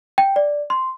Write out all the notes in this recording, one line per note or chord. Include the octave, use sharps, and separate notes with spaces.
G5
D5
C6